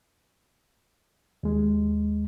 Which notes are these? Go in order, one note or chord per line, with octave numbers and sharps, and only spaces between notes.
D#2 G#3